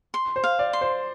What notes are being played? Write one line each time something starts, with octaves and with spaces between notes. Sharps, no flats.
C6
C5
F5
D5
C6
C5